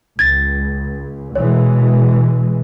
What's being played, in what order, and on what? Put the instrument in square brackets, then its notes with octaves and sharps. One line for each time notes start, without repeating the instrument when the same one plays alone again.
[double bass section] C#2 [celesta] G#6 A6
[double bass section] B2 E3 G#3 [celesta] C#5